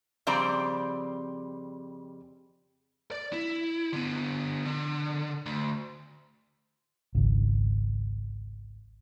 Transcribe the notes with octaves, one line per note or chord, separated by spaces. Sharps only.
F2 C#3 G3 C4 D5 A#5
D5
E4
D3 B3
D3
D2
G#1 C#2